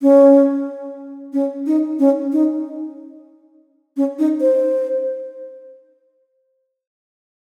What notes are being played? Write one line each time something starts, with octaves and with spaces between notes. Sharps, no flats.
C#4
C#4
D#4
C#4
D#4
C#4
D#4
C5